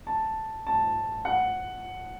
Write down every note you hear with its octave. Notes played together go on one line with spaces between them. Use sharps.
A5
A5
F#5